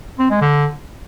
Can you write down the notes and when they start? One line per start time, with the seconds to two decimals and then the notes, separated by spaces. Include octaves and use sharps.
0.19 C4
0.30 G#3
0.41 D3